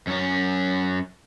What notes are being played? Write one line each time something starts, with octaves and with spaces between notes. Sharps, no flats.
F#2 C#4